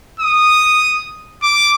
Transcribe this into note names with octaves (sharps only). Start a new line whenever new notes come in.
D#6
D6